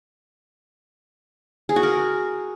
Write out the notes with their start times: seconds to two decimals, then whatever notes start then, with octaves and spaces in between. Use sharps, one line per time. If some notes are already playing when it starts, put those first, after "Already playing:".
1.69 G#4
1.76 F#4
1.83 A#4